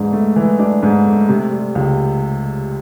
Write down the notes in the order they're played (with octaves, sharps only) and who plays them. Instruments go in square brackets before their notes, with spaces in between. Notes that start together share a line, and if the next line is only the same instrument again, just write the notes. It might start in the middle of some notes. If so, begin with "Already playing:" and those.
Already playing: [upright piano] G#2 E3 D4
A3
E3
D4
G#2
A3
C3
G3
C#2